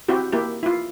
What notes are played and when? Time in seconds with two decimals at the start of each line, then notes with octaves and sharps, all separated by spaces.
0.08 C4 E4 F#4 G4
0.33 A#3 E4 G4
0.63 E4 F4